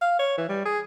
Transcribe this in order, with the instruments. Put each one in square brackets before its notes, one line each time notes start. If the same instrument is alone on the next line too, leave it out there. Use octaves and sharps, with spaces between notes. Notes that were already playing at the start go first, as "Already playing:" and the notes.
[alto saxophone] F5
C#5
E3
G3
G#4